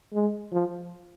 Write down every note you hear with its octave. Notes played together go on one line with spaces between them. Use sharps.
G#3
F3